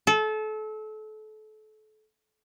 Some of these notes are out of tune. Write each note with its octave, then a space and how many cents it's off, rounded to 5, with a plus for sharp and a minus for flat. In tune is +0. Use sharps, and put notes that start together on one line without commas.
A4 -30